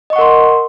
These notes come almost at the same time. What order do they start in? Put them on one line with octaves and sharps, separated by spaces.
D#5 C#6 F#5 A#4 C6